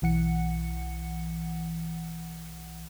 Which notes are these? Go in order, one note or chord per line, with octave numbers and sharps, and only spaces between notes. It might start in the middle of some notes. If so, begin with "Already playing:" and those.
B1 E3 F#5 C#7